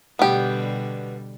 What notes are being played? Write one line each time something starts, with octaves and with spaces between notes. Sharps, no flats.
B2 D3 G3 B3 G4